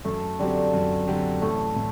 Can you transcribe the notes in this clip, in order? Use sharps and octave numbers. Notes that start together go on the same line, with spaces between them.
F#2 A3
D3 F#3 G3 C4 G4
A3
F#2
D3 F#3 C4 G4
A1 A3
A2